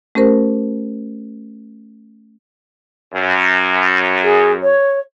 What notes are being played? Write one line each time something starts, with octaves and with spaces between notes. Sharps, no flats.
A3 C#4 G4 A#4 C5
F#2
G#4
C#5